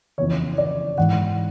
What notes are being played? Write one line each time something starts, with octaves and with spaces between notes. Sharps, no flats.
F2 C#3 E3 C#5
D5
G#2 E3 F#5